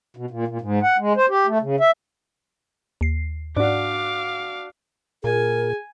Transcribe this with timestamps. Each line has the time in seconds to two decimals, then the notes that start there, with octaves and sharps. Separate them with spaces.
0.17 B2
0.31 A#2
0.48 A#2
0.61 G#2
0.83 F#5
0.98 G#3
1.17 C5
1.29 G4
1.47 A3
1.62 C#3
1.80 E5
3.01 D#2 C7
3.57 G#2 D4 F#4 F5 D6
5.24 A#2 G#4 A#4 G#5